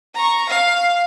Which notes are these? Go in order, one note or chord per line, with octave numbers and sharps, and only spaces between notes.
A#5 C#6
F5